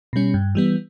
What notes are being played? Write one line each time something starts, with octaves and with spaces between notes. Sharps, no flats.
B2 G3 C#4
G2
E3 G3 B3